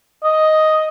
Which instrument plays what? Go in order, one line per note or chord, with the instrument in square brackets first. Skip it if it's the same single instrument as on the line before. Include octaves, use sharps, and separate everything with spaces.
[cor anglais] D#5